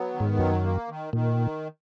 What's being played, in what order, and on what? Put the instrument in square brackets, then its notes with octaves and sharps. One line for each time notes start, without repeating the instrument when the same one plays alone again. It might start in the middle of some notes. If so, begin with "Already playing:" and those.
Already playing: [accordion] F#3 B3
D#3
[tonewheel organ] G#2
[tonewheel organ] F#2 [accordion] F#3
[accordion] A#3
D#3
[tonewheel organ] A#2 [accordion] D#3